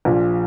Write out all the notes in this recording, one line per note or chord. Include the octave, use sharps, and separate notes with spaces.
A#1 A#2 F3